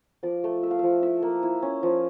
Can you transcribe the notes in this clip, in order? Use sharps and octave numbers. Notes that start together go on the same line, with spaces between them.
F3 D5
A3
A3 E5
F5
F3 E5
E4 E5
A#3
E4
C#4
F3